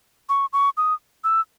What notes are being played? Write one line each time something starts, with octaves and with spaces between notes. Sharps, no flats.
C#6
C#6
D#6
E6